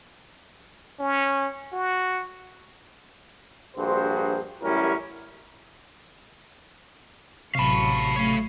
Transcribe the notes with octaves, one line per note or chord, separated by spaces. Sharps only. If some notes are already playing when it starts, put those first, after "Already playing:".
C#4
F#4
A#1 G2 F#4 G#4 C5
A1 F#2 G3 C#4 E4 A#4
A1 C3 F#3 F5 A5 B5 C#6
A3 C#5 F5